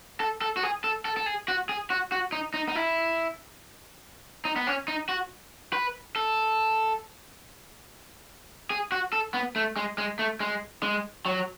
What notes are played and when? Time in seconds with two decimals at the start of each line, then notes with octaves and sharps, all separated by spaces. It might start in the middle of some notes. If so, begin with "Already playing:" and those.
0.20 A4
0.41 A4
0.57 F#4
0.63 G#4
0.84 A4
1.05 A4
1.17 A4
1.26 G#4
1.48 F#4
1.69 G#4
1.90 F#4
2.12 F#4
2.32 D#4
2.54 D#4
2.69 D#4
2.76 E4
4.45 D#4
4.56 B3
4.67 C#4
4.88 D#4
5.09 F#4
5.73 B4
6.16 A4
8.70 G#4
8.92 F#4
9.13 A4
9.34 B3
9.56 A3
9.77 G#3
9.98 G#3
10.19 A3
10.40 G#3
10.83 G#3
11.26 F#3